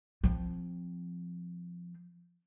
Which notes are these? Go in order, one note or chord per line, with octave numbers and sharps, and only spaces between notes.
F3 C4